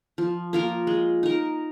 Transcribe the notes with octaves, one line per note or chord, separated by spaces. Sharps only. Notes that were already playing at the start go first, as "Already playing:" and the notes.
F3
A#3 F4 A#4
G#3
D#4 A#4